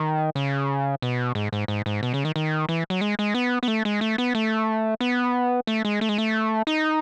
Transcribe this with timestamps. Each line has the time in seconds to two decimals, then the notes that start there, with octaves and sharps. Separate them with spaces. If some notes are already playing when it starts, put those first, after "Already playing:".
Already playing: D#3
0.35 C#3
1.02 B2
1.35 G#2
1.53 G#2
1.68 G#2
1.86 G#2
2.03 B2
2.14 C#3
2.25 D#3
2.36 D#3
2.69 E3
2.90 F#3
3.01 G#3
3.19 G#3
3.34 B3
3.63 B3
3.68 A3
3.85 G#3
4.01 A3
4.18 B3
4.35 A3
5.01 B3
5.67 A3
5.85 G#3
6.01 A3
6.09 G#3
6.18 A3
6.67 D#4